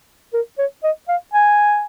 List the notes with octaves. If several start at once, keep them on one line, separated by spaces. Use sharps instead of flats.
A#4
C#5
D#5
F5
G#5